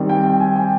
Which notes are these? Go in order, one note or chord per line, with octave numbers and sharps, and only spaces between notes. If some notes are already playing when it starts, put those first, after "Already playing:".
Already playing: D#3 G3 C4
G5
G5
G#5
G5